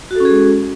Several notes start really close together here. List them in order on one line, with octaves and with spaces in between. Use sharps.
F#4 A4 C#4 G#4 G#3